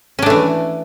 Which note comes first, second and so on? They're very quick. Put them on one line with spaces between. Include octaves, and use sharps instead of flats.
C#4 D4 A3 E3